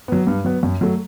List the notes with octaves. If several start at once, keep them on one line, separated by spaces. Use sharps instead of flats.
F#3 B3
G2
F#3 B3
F#2
F#3 A3